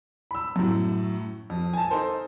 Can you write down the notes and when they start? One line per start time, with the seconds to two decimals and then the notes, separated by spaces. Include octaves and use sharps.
0.31 B5 E6
0.56 F#2 A2
1.50 F2
1.73 G#5 A5
1.91 D#4 A4 A#4 C5